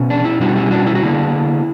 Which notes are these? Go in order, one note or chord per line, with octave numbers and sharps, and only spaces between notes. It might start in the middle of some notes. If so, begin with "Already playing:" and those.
Already playing: B2 C#4
D4
E4
B2 G3 C#4 D4 F#4
E4 G4
G4
D4 F#4
E4
F#4
D3 A#3 D4 E4